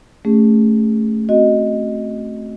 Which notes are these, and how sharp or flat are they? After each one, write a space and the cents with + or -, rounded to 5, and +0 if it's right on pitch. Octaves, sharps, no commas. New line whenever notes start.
A3 +0 C#4 +0 G#4 -30
C4 +5 F#4 +0 D#5 +0